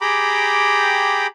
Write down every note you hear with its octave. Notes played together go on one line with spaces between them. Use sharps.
G4 G#4 G5 A#5 B5 D6